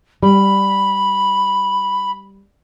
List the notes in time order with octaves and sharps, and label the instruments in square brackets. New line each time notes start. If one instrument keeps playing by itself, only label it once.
[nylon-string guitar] G3 [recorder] B5